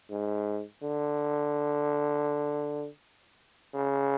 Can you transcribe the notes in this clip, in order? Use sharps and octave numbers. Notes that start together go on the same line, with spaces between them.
G#2
D3
C#3